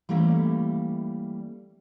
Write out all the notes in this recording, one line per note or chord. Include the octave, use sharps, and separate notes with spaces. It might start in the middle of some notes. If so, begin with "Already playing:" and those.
E3 G3 A3 A#3 C#4